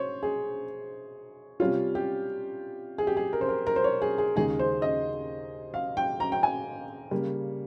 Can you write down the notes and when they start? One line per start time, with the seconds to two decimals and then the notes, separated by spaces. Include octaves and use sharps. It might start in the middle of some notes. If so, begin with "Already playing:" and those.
Already playing: C5 C#5
0.23 G#4
1.60 C3 G3 C#4 F4
1.95 G4
2.98 G#4
3.07 G4
3.17 G#4
3.33 A#4
3.41 C5
3.49 A#4
3.67 A#4
3.76 C5
3.84 C#5
4.02 G#4
4.18 G#4
4.36 D#2 C#3 G#3 D#4 G#4
4.59 C5
4.82 D#5
5.74 F5
5.97 G5
6.20 A#5
6.32 G5
6.43 G#5
7.11 C#3 G3 A#3